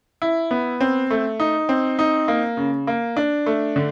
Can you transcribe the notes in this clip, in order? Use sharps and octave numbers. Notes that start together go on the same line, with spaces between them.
E4
B3
C4
A3
D#4
C4
D#4
A#3
C#3
A#3
D4
A3
D3